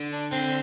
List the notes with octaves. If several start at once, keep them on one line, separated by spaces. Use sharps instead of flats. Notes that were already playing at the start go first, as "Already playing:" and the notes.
Already playing: D3
D4
D3 C4